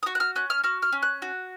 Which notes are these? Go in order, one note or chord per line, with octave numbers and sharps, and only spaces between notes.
D#6
F#4 C#6
F#6
F6
C#4 F#6
F6
F#4 F6
F6
C#4
F#6
F#4